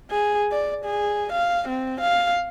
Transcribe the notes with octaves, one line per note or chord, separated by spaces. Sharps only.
G#4
D5
G#4
F5
C4
F5